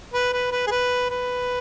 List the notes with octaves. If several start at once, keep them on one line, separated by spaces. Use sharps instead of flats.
B4
B4
B4
G#4
B4
B4